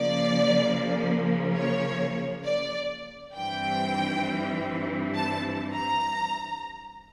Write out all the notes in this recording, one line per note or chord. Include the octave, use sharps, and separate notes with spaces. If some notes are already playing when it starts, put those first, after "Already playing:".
Already playing: C#3 F3 A#3 D5
C#5
D5
G2 E3 G3 C4 G5
A5
A#5